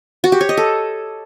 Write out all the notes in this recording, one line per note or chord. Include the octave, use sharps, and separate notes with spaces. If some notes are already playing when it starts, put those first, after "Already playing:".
F#4
G4
C#5
D#5
A4